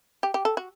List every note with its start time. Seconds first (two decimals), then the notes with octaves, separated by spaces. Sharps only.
0.23 G4
0.34 G4
0.45 A4
0.57 F#4